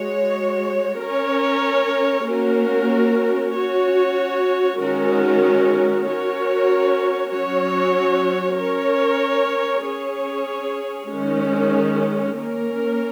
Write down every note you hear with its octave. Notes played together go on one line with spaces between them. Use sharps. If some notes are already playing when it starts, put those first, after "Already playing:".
Already playing: G#3 F#4 C#5
C#4 A#4 C#5
A#3 C#4 F#4 A#4
C#4 F#4 C#5
D#3 G#3 C#4 F#4 A#4
C#4 F#4 A#4 C#5
F#3 C#4 F#4 C#5
C#4 A#4 C#5
C#4 G#4 C#5
D#3 G#3 C#4
A#3 C#4 A#4